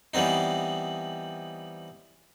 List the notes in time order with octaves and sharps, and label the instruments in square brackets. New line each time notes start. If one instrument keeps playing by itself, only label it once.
[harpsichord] E3 G3 B3 C4 D#4